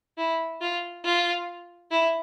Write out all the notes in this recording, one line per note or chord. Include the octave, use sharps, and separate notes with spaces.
E4
F4
F4
E4